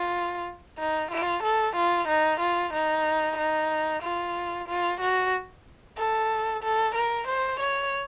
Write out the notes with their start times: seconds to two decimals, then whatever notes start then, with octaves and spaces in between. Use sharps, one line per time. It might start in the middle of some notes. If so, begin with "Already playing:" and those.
Already playing: F4
0.79 D#4
1.11 F4
1.43 A4
1.76 F4
2.08 D#4
2.41 F4
2.74 D#4
3.38 D#4
4.03 F4
4.68 F4
5.01 F#4
5.98 A4
6.63 A4
6.95 A#4
7.28 C5
7.60 C#5